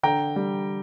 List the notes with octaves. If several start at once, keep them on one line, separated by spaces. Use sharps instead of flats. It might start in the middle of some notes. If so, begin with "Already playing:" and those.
D3 G5 A#5
G3